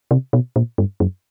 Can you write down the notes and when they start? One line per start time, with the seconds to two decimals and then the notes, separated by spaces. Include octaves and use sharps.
0.11 C3
0.33 B2
0.56 A#2
0.78 G2
1.00 F#2